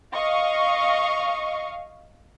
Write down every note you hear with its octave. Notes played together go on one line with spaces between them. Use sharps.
D#5 F5 C#6